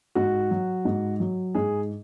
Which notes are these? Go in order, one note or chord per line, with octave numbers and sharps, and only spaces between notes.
G#2 F#4
F#3
G#2
F#3
G#2 G#4